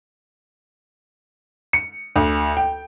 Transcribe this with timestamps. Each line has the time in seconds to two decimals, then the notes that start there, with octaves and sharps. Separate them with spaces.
1.73 C#7
2.16 D2
2.57 G5